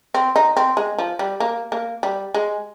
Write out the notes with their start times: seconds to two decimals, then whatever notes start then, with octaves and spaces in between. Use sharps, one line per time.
0.14 C4
0.36 D#4
0.57 C4
0.77 G#3
0.98 F3
1.19 G3
1.40 A#3
1.72 A#3
2.03 G3
2.34 G#3